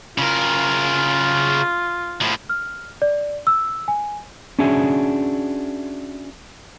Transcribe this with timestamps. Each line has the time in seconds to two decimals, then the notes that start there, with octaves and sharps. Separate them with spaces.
0.18 C#3 F4 A#4
2.21 A2 F3
2.50 F6
3.02 D5
3.47 E6
3.88 G#5
4.59 C#4 D4 F#4 G#4 E5